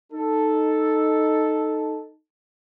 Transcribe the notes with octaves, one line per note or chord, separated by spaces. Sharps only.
D#4 A4